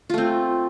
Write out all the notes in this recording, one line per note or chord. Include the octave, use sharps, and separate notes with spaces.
A3 C4 F4